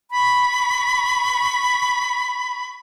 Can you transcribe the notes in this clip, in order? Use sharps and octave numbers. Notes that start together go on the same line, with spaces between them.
B5 C#6